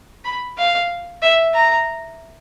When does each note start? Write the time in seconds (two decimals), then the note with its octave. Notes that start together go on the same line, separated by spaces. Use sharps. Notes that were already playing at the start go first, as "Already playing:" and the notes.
0.25 B5
0.58 F5
1.22 E5
1.54 A#5